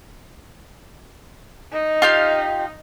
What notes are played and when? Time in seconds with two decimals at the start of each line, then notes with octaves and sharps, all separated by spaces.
1.72 D#4
2.02 F4 G4 F5